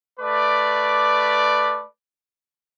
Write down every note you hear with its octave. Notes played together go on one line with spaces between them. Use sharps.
A3 B4 D5 D6